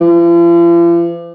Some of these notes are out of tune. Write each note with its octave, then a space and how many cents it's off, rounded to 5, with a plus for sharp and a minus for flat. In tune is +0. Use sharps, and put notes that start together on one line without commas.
F3 -45